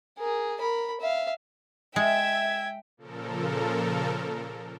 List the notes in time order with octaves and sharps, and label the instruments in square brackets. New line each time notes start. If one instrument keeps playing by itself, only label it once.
[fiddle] G#4 A#4
A#4 B5
E5 F5
[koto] G#3 [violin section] E5 [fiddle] G5 [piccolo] G#6
[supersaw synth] A#2 C#3 F3 A4 A#4